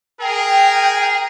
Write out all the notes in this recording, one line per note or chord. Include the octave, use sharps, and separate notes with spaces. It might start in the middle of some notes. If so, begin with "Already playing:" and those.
G#4 A#4 G5